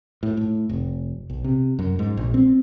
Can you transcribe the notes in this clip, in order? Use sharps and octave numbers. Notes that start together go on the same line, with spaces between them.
A2
A2
F1
B1
C3
F#2
G#2
A#1
C4